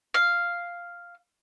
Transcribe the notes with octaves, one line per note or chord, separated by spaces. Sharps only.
F5